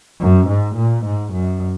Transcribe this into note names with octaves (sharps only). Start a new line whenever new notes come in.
F#2
G#2
A#2
G#2
F#2